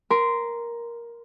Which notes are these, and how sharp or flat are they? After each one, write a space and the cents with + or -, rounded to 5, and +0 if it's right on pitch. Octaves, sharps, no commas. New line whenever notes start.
A#4 +10 C6 -15